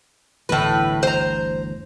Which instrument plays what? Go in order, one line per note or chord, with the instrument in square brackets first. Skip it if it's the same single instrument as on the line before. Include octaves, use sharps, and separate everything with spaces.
[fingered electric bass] G1 D2 E3 [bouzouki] A2 B4
[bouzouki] C5 A#5